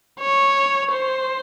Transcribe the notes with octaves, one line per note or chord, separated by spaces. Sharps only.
C#5
C5